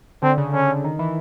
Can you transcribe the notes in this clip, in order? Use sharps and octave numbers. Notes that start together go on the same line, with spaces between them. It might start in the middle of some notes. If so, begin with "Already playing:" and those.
D3 C4
C#3
D3 C#4
D3
D#3
E3